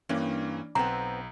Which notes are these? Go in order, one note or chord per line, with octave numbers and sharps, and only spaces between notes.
G2 E3 A#3 C#4
B1 B3 C4 A#5